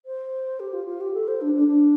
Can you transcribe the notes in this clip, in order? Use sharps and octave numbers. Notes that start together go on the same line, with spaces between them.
C5
G4
F4
F4
G4
A4
C5
D4
D4
D4